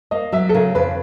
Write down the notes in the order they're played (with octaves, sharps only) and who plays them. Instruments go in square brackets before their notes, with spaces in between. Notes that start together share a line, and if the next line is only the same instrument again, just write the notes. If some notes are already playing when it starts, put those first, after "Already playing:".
[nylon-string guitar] A#3 [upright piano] D#5
[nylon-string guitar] F#3 [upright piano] E5
[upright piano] A4
[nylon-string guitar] C#3 [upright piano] A#4
[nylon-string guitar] F2 [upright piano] B4